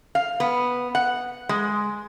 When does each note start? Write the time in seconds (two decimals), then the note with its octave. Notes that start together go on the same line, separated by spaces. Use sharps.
0.15 F5
0.40 B3
0.95 F#5
1.49 G#3